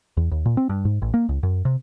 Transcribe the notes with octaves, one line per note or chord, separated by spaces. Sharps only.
E2
D#2
A#2
C4
G2
G#2
A1
A#3
C#2
F#2
C3